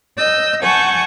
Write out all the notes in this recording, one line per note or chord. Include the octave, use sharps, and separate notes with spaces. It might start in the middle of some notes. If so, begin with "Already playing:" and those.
D#5 E6 G6
F#5 G#5 A5 C#6 G6